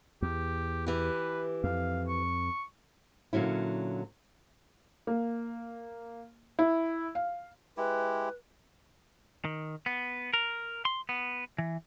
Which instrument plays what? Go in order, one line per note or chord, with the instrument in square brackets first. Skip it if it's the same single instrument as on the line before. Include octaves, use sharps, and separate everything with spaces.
[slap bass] E2 [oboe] G4
[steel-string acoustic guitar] E3 G4 [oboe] B4
[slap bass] F2 [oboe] F5
[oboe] C#6
[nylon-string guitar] A#2 D3 F#3 C#4 E4
[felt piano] A#3
E4
F5
[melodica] G#3 E4 G4 [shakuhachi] B4
[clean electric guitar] D#3
B3
A#4
C6
B3
E3